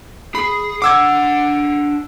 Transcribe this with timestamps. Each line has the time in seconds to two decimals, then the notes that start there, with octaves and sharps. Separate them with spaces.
0.35 G#4 B5
0.82 D4 F#5 D6 E6 G#6